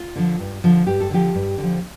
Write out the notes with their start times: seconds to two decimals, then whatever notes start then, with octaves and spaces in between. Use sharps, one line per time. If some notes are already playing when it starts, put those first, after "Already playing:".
Already playing: F4
0.16 D3 F3
0.39 G2
0.64 D3 F3
0.87 G2 G4
1.00 A4
1.10 D3 F3 G4
1.35 G2
1.58 D3
1.63 F3